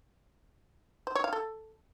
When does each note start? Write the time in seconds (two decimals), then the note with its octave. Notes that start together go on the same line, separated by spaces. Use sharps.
1.07 C5
1.15 C#5
1.24 F5
1.33 A4